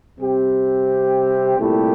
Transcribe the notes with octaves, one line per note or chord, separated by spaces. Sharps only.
C3 G3 C4 G4
C2 A#2 A3 E4 G4